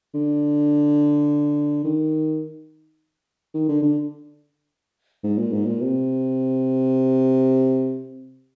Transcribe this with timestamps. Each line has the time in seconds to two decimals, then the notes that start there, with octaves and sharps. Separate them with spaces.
0.14 D3
1.85 D#3
3.54 D#3
3.69 D3
3.82 D3
5.24 G#2
5.38 A#2
5.53 G#2
5.66 A#2
5.81 C3